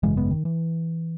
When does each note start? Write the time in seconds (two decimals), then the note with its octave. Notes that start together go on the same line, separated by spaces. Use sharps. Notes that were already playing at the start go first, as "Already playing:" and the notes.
0.03 G#1 F#2 C#3 E3 G#3
0.17 G#3 B3
0.31 D#3
0.45 E3